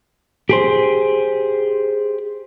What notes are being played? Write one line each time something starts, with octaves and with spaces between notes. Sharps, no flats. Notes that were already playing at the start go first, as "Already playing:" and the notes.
G4 G#4 C5